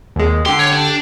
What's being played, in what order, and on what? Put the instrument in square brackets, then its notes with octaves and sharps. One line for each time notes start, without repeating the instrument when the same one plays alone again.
[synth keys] D#2 G#3
[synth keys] D3 G4 [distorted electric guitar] C6
[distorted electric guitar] C#5
D4